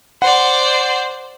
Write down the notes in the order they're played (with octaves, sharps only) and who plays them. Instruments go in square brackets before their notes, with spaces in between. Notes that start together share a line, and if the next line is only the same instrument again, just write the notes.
[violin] C5 D5 [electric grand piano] F#5